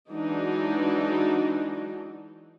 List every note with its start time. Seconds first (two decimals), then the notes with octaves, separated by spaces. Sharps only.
0.12 E3 F#3 G#3 D4 D#4 F#4